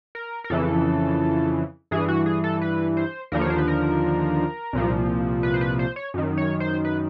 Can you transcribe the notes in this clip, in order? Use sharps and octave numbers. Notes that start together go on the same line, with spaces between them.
A#4
A#4
F2 C#3 E3 A4
G2 E3 G#4
F#4
G#4
A4
B4
C5
D#2 D3 F3 A#4
C#5
C5
B4
A#4
C2 A#2 F3
B4
C5
B4
C5
C#5
F#2 D#3
C#5
C5
B4